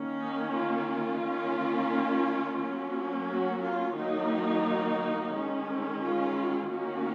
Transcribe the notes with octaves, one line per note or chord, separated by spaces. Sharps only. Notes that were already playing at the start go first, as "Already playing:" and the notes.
Already playing: D#3 A#3 C#4
D#4
F4
D#3 A#3 C#4
F#3 A#3 C#4
F#4
F4
D#3 F#3 A#3 D#4
D#3 G#3 C#4
F4
D#3 A#3 C#4 F#4